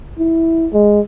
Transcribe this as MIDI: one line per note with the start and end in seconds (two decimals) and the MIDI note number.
0.19 0.68 64
0.73 1.00 56